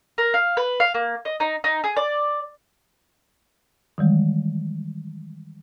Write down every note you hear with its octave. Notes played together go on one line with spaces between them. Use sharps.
A#4
F5
B4
F5
A#3
D#5
D#4
D#4
G#4
D5
D#3 E3 G3 G#3